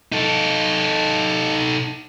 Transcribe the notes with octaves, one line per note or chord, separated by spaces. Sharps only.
D#4 A4